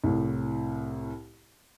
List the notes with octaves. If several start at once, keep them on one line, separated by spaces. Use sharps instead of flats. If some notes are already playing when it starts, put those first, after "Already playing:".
C2 A2